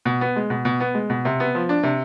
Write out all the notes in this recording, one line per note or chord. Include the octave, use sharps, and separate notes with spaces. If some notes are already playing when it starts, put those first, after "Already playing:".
B2
B3
G#3
B2
B2
B3
G#3
B2
C3
B3
F3
D4
C3